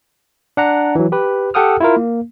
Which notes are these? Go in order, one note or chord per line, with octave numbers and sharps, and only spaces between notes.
D4 F#5 A#5
E3 F#3
G4 B4
G4 A4 F#5 G5 D#6 F6
E4 F4 A#4
A#3